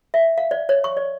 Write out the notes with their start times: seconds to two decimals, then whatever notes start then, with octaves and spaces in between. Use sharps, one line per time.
0.14 E5
0.38 F5
0.51 D5
0.69 C#5
0.84 C#6
0.97 D5